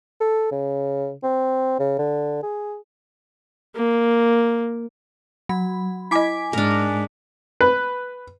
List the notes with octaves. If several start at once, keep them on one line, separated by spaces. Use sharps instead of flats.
A4
C#3
C4
C#3
D3
G#4
A#3
F#3 B5
E4 D#5 G#5 D6 B6
G#2 D4 A#4
B4